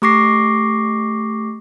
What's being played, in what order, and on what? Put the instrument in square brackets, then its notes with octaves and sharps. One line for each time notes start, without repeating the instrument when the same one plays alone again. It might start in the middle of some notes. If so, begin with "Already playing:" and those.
[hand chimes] A3 G4 C#6 D6 A#6 C7